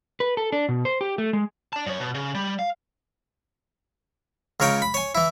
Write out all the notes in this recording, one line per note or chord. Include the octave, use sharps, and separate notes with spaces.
B4
A4
D4
B2
C5
G4
A3
G#3
D5 A5
F#2 C#5
B2
C#3
G3
F5
C#2 C#3 A#4 C#5 G5
B5
C#5 G#5
E3 E4